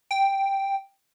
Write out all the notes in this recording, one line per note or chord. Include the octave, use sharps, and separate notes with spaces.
G5